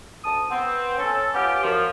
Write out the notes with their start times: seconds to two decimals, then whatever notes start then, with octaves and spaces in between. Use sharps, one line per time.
0.24 D2 A5 D#6
0.50 B3 C4
0.99 C#4 A4
1.34 B3 C#4 F4 G4
1.63 F#2 F3